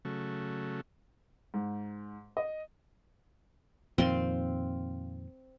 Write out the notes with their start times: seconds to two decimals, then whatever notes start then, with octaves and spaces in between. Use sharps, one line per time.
0.05 C#3 F#3 A3
1.54 G#2
2.37 D#5
3.98 F2 A#2 D#3 C4 F5 C6